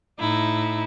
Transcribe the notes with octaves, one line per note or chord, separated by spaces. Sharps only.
A2 D#4 E4